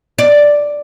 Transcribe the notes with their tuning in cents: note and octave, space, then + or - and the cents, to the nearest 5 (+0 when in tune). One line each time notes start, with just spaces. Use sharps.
D5 +0